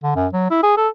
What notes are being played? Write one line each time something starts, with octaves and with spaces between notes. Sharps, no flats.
D3
F#2
F#3
E4
G#4
A4